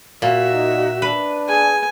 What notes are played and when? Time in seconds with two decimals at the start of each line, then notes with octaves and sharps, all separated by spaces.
0.22 A#2 F#4 E5
0.53 D#4
1.02 D4 B4
1.48 G#4 G#5